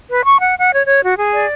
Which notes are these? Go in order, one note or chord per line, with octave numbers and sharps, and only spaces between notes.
B4
C#6
F#5
F#5
C#5
C#5
F#4
G#4
D5